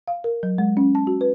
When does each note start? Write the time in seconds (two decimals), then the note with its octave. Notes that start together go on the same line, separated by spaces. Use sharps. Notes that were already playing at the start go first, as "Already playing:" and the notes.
0.08 F5
0.24 A#4
0.43 F#3
0.58 G#3
0.77 C#4
0.95 A5
1.07 F#4
1.21 B4